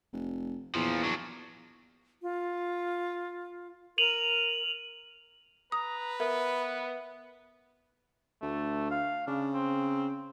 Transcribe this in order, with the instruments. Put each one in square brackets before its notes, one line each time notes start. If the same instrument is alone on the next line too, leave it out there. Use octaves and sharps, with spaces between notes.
[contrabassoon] F1
[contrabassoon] E2 [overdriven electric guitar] A#2 F3
[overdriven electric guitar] F#3 D4
[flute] F4
[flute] A#4 [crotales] D#7 F7 F#7
[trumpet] B4 [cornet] A#5 [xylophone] D#6
[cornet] B3 [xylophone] A#4 [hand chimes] E5
[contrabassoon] D2 [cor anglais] A3
[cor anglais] F5
[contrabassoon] C#3 [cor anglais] D4
[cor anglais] C4